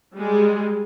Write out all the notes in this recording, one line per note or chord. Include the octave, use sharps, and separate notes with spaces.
G3 G#3